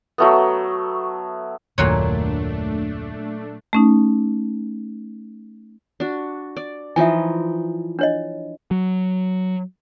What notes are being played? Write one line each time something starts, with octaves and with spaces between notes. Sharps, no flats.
F#3 A3 B3
F#1 D#2 A#2 F#3 A3 D4 C#5
A3 C#4 D#4
D4 F#4
D5
E3 F3 D#4 E5 G#5
D4 C#5 D#5
F#3